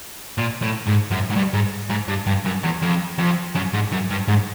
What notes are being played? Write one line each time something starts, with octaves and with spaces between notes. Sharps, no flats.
A#2
A2
G#2
F#2
G#2
G2
G#2
G#2
G2
G2
F#2
E2
F2
F2
F#2
G#2
F#2
G2
G#2